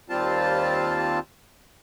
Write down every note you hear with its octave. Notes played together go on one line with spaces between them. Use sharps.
D#2 G3 C4 F4 A5